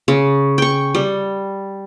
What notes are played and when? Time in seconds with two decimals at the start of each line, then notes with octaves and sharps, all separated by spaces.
0.08 C#3
0.58 G5 C#6
0.95 G3